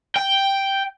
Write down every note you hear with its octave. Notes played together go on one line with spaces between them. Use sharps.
G5